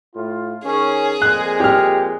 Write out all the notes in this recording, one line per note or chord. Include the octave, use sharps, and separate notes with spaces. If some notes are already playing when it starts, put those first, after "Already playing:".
A2 F4
D#3 C#4 G#4
F2 A#2 G#3 F#6
G4 F6